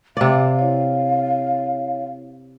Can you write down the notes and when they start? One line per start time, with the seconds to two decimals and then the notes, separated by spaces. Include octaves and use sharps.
0.17 C3 D5 F5
0.59 E4 C#5